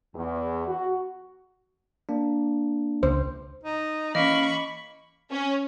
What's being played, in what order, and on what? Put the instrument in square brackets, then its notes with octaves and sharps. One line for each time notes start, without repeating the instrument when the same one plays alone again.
[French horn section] E2
F#4
[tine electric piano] A#3 D4
[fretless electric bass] C#2 [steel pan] C5
[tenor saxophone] D#4
[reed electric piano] E3 C#4 [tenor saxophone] A#3 [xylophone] D#5 [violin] B5 C#6
[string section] C#4